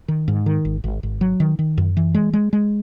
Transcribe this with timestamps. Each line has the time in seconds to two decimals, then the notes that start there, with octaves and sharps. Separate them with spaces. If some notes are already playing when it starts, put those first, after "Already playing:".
0.08 D#3
0.28 G#2
0.46 D#3
0.65 G#1
0.84 G#1
1.03 G#1
1.21 F#3
1.40 D#3
1.59 D#3
1.78 F#2
1.97 E3
2.14 G#3
2.33 G#3
2.53 G#3